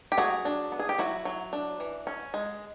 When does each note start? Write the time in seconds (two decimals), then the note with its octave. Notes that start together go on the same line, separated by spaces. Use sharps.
0.12 G4
0.17 F#3 F#4 G#4
0.45 D4
0.72 B3
0.79 G#4
0.89 G4
0.98 F#3 E4 F#4
1.25 F#3
1.53 D4
1.80 E3
2.07 C#4
2.34 G#3